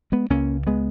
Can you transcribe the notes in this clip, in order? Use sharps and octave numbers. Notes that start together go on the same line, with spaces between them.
G#3 B3
C#2 C#3 A#3 C#4
G#3 B3